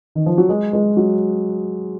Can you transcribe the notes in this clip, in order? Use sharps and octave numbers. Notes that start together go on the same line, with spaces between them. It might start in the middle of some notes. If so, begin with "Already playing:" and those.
D#3
F3
F#3
G#3
G#3
F#3